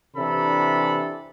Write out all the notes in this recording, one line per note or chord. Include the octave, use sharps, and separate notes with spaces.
C3 E3 D4 A4 B5